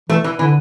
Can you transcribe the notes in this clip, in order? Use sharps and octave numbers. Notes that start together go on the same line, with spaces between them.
E3 A3
E3
D3 E3